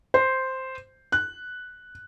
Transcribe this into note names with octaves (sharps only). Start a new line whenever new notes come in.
C5
F#6